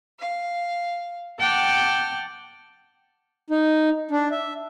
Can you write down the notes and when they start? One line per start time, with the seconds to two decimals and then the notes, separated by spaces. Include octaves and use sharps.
0.20 F5
1.39 F#5 G5 A5 D6 F6
3.50 D#4
4.11 D4
4.31 E5